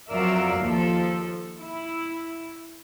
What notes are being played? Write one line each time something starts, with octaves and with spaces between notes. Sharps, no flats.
F2 F#3 A#4 D5 E5 F5
D#2 F3 A4
E4